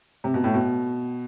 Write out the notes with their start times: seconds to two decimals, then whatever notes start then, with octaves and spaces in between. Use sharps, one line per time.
0.24 C3
0.34 B2
0.44 A2
0.54 B2